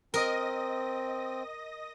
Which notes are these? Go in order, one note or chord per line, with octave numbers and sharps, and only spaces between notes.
C4 A#4 D#5 D#6 A#6